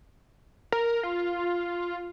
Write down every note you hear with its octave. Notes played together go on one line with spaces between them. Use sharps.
A#4
F4